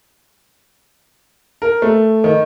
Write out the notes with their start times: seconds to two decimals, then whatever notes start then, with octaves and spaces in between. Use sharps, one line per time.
1.62 A#4
1.82 A3
2.24 D#3